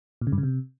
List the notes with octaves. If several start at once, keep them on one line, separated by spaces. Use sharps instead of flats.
A#2
C#3
G2
C#3
C3